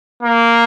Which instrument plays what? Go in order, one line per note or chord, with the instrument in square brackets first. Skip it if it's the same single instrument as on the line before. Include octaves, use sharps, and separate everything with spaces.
[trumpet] A#3